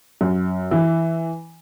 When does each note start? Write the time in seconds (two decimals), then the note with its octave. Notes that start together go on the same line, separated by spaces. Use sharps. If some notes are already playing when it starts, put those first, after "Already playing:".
0.21 F#2
0.71 E3